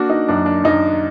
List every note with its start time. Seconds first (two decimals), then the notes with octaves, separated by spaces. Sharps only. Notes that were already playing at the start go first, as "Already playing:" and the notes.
Already playing: A#3 D4 F#4
0.10 D#4
0.28 F#2 D4
0.46 D4
0.64 F#2 D#4